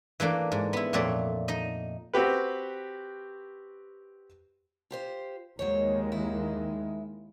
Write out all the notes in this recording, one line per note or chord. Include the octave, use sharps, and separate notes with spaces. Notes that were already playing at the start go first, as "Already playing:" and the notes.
E3 A3 A#3 D4
G#2
B3 E4
F2 A#2 A3 C#5 D5
D#4 D#5
C4 F#4 G4 B4
F4 G4 C5
D#2 D#3 F#3 G#3 C5 C#5
E4